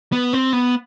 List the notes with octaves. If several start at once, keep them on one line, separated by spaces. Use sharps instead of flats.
B3
C4
B3